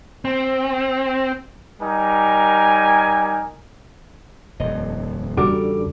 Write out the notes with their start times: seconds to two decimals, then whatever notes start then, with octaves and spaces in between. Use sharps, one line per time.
0.25 C4
1.81 G3 D#4 A#4 G#5
4.60 D#1 F2 D#5
5.37 E2 C#3 G3 D4 F#4 A4 A#4 D6